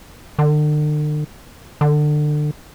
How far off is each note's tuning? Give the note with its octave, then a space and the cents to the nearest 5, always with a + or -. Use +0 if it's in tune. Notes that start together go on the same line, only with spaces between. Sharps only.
D3 +45
D3 +30